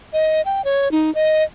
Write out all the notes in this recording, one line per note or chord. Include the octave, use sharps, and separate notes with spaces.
D#5
G5
C#5
D#4
D#5